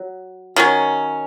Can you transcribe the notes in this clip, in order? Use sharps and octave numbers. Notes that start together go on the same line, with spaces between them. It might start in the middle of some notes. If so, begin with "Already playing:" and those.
Already playing: F#3
D#3 F#3 C#4